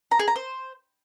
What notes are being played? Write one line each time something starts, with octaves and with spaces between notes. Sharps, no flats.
A#5
G#4
A#5
C5